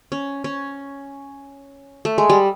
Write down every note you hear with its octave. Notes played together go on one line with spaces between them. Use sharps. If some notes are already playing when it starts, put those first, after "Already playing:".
C#4
C#4
A3
G#3
G3